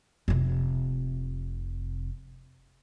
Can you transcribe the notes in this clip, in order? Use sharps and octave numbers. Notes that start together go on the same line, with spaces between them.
F1 C3